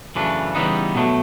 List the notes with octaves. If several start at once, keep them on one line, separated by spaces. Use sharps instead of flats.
F#2 C#3 E3 A3 D4
C#3 E3 G3 B3 D#4
B2 F#3 A3